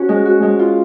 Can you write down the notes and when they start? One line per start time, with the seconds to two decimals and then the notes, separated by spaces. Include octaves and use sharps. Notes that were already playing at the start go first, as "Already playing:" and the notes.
Already playing: C#4 F#4
0.09 G#3
0.25 F#4
0.42 G#3
0.59 F4